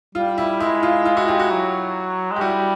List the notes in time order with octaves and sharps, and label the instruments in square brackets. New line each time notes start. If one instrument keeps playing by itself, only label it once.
[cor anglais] G3 [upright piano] F4
[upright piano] E4
[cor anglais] G#3 [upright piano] E4
[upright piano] F4
F4
E4 F#4
F4 G4
E4 F#4
[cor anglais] F#3
[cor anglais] G#3 [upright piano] G4
[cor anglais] G3 [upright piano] E4 F#4